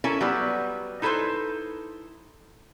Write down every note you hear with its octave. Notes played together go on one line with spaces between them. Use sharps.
C#4 E4 A4 A#4
F#3 G3 B3
D#4 E4 A4 B4 C5